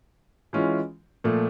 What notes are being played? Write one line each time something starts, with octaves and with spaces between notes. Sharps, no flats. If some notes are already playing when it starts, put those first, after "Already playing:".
E3 G#3 C#4 F4
A#2 F3 A3